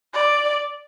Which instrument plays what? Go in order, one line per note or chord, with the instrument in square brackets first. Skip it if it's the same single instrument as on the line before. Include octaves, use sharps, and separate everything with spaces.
[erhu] D5